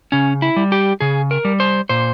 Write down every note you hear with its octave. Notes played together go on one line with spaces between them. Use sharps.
C#3 C#4
E4
G3
G4
C#3 G#4
A#4
G3
C5
A#2 C5